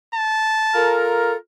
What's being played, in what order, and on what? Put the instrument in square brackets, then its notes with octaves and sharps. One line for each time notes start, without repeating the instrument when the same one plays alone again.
[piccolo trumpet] A5
[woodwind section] F4 A4 A#4